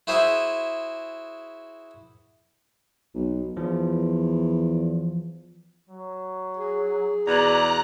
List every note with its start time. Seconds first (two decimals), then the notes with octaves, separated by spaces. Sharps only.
0.07 E4 F#4 G#4 C5 E5
3.15 B1
3.57 E2 E3 F3
5.89 F#3
6.57 G#4
7.27 E2 B2 D5 A#5 F#6